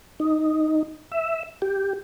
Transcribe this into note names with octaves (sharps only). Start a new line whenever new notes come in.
D#4
E5
G4